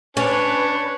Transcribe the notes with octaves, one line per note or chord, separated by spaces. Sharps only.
C#4 D4 B4 C#5